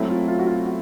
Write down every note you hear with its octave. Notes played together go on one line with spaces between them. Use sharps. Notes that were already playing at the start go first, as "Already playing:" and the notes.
Already playing: F#3 A3 C4 E4
F4
F4
F#4
F4
F#4